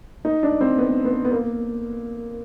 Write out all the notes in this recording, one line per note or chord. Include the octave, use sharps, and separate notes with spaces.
D#4
D4
C4
B3
B3
B3
A#3